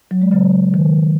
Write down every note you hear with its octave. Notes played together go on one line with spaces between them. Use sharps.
F#3
G#3
C#3 F#3
D#3